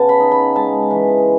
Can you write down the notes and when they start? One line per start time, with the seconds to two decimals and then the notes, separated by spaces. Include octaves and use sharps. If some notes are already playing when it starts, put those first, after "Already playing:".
Already playing: C#3 B3 A5
0.09 B5
0.20 D#4
0.32 B5
0.56 G#3 A5
0.91 E3